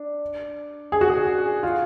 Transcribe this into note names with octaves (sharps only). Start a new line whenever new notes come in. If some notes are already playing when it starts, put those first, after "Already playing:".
Already playing: D4
G#4
F#4
G#4
F4